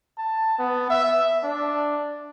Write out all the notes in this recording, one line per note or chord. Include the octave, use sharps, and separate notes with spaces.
A5
B3
E5
D4